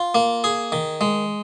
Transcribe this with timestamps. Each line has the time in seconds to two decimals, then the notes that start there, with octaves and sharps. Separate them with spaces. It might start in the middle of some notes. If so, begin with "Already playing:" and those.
Already playing: F4
0.15 A#3
0.44 G#4
0.72 D#3
1.01 G#3